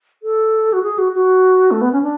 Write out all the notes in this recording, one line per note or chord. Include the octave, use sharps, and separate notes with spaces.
A4
F#4
G#4
F#4
F#4
A3
B3
C#4
D4